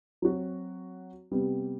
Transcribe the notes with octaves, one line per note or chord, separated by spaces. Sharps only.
F#3 C4 F#4
C3 G3 B3